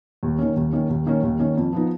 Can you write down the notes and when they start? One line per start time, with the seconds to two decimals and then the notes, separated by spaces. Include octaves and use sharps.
0.23 D#2
0.39 D#3 A#3 C#4
0.56 D#2
0.73 D#3 A#3 C#4
0.90 D#2
1.06 D#3 A#3 C#4
1.23 D#2
1.39 D#3 A#3 C#4
1.57 F2
1.73 F3 B3 D#4